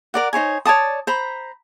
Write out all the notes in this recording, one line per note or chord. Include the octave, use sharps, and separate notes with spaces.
A#4 D5 F#5
D#4 C5 C#5 G#5
C#5 D5 A5 D#6
C5 A#5 B5